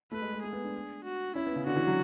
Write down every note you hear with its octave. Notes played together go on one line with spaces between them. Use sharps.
A3 B4
G#3
G#3
A3 G#4
B3
D4
F#4
C#4 E4
B3
C#3
D3 F#4
E3
F#3